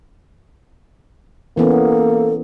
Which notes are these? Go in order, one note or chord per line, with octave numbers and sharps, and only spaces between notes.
E3 A#3 B3 C#4 A4